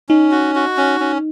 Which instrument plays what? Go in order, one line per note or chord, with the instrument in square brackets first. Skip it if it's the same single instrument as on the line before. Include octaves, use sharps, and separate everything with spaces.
[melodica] C#4 [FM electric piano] D#4
[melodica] F#4
F#4
C#4
C#4